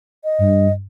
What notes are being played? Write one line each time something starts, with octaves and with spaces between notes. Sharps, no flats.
D#5
G2